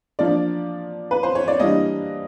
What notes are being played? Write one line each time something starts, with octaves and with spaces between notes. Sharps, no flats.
F3 A#3 D4 D5
B4
C5
C#5
D5
E3 G3 A#3 D4 D#5